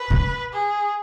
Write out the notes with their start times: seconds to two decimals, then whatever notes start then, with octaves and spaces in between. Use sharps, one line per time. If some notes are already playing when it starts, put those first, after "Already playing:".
Already playing: B4
0.10 C#3
0.52 G#4